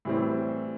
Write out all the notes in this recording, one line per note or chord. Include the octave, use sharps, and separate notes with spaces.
A2 E3 G3 C4